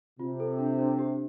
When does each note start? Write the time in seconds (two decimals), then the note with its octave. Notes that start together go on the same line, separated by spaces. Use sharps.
0.19 C3 F4
0.40 A4
0.59 D4
0.79 D4
0.99 G4